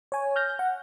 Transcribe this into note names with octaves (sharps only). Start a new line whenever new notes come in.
C#5 G#5
F6 G6 A#6
F#5